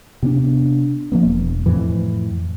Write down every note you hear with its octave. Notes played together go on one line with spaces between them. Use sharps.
C3 B3 C4 D4
F3 A#3 B3
E1
F2 A2 E3